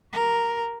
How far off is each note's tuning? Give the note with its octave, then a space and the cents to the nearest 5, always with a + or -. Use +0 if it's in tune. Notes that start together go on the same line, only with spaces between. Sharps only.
G4 -30 A#4 +0